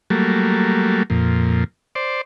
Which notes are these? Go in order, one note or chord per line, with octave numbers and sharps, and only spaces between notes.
F#3 G3 A3 A#3
F2 A#2
C5 D5